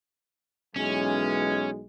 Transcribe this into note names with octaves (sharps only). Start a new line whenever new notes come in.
B1 E3 G#3 C#4